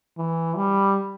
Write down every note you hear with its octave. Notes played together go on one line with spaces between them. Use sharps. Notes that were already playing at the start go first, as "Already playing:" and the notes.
E3
G3